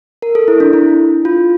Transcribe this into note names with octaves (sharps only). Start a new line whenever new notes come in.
A#4
A4
E4
D4
E4
F4